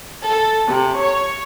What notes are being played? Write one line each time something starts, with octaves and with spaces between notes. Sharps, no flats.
A4
C3
C#5